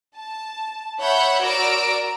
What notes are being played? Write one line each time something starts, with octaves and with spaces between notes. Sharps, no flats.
A5
C#5 E5 F#5 B5 G6
F#4 A#4 D5 E6 D7